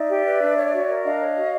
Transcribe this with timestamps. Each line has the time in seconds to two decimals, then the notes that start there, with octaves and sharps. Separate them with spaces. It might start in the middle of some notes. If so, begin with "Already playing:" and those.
Already playing: D#4 D5 E5
0.09 G4
0.25 B4
0.41 D4
0.57 C#5
0.73 F#4
0.89 A#4
1.04 D4 D#5 F5
1.20 C#5
1.36 F#4